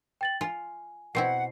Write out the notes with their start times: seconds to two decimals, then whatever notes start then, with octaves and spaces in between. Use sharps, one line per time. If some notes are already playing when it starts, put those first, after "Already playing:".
0.21 G5 A6 F#7
0.41 F4 G#5
1.15 B2 C4 E4 F#5 C7